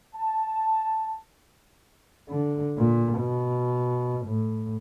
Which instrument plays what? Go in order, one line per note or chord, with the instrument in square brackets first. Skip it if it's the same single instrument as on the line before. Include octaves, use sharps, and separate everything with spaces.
[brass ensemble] A5
[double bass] D3
A#2
B2
A2